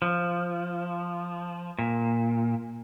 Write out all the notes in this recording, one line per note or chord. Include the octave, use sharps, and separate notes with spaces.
F3
A#2